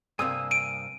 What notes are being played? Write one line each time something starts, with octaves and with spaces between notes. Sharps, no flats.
G2 C3 A#3 G#5 D#6 E6
D7 D#7